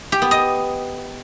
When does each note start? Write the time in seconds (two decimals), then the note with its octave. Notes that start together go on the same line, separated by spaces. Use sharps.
0.12 G4
0.22 B3
0.31 D#5